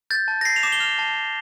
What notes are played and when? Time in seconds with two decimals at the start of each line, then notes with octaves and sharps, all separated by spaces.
0.10 G6 A6
0.28 A5
0.41 A#6
0.45 A5 C7
0.56 F7
0.63 D6 E7
0.72 G7
0.80 F6 F7
0.99 A5
1.16 A5